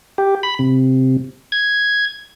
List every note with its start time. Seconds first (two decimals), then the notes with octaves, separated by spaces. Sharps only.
0.18 G4
0.43 B5
0.59 C3
1.52 G#6